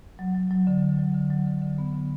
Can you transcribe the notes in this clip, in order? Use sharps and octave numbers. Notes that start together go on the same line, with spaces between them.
F#3
F#3
F#3
D3
D3
F#3
D3
F#3
D3
D3
B3
D3